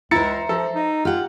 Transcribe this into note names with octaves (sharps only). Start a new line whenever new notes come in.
C#2 E4 C5 E5 A#5 A6 C#7
F3 A4
D#4
F4 G4 F#5